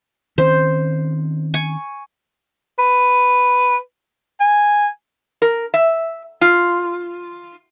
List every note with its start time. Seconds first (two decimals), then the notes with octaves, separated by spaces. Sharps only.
0.38 D#3 C4 C#4 C5
1.54 G#5 C#6
2.79 B4
4.40 G#5
5.42 A#4
5.74 E5
6.41 F4